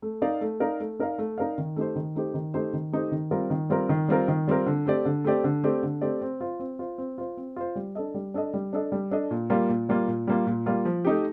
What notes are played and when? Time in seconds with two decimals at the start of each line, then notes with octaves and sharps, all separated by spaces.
0.02 A3
0.22 D#4 A#4 D5 F5
0.41 A3
0.60 D#4 A#4 D5 F5
0.80 A3
0.99 D#4 A#4 D5 F5
1.18 A3
1.38 D#4 A#4 D5 F5
1.58 D#3
1.76 A3 D#4 G4 C5
1.96 D#3
2.15 A3 D#4 G4 C5
2.34 D#3
2.54 A3 D#4 G4 C5
2.73 D#3
2.92 A3 D#4 G4 C5
3.12 D#3
3.31 G3 C4 F4 A#4
3.50 D#3
3.70 G3 C4 F4 A#4
3.89 D#3
4.08 G3 C4 F4 A#4
4.28 D#3
4.48 G3 C4 F4 A#4
4.66 D3
4.86 A3 C4 G4 D5
5.05 D3
5.24 A3 C4 G4 D5
5.44 D3
5.64 A3 C4 G4 D5
5.83 D3
6.01 A3 C4 G4 D5
6.22 C4
6.41 F4 C5
6.60 C4
6.79 F4 C5
6.98 C4
7.18 F4 C5
7.37 C4
7.56 F4 C5
7.76 G3
7.95 D4 A4 D#5
8.14 G3
8.34 D4 A4 D#5
8.54 G3
8.73 D4 A4 D#5
8.92 G3
9.11 D4 A4 D#5
9.31 A#2
9.50 G3 A#3 F4
9.69 A#2
9.89 G3 A#3 F4
10.08 A#2
10.27 G3 A#3 F4
10.47 A#2
10.66 G3 A#3 F4
10.85 F3
11.05 A3 D#4 G4